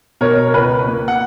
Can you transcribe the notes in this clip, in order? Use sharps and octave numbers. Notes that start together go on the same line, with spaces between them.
B2 A#4 C#5
A#4
C#2 B4
A#3
F#5